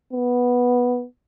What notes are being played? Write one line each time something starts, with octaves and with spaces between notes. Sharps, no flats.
B3